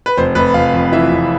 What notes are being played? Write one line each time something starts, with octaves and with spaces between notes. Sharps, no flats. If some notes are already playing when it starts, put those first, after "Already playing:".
B4
F1 C5
F1 B4
F1 F5
F2
E3 E5
F1